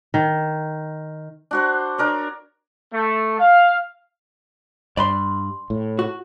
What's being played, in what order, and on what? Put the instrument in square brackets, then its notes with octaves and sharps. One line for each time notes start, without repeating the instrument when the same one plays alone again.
[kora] D#3
[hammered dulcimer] D4 F#4 C5
D4 A#4 C#5
[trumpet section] A3
F5
[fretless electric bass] G2 [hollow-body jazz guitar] D5 B5 C6
[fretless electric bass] A2
[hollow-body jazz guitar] F#4